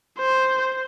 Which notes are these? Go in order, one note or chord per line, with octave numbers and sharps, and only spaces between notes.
C5